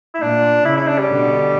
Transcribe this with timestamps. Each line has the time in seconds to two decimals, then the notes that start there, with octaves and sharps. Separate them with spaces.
0.15 E4
0.21 A#2 D4
0.65 C#3 E4
0.77 E4
0.87 D4
0.98 G3
1.09 B2 D3